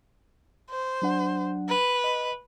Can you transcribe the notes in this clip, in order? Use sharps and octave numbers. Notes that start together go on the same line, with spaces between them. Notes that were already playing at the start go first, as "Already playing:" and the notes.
C5
F#3 D4 F#5
B4
D#5